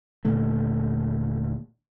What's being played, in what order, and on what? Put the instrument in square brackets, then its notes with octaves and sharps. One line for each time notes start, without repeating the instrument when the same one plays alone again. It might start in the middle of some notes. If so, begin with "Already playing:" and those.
[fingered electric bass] D#1 A#2 D3 A3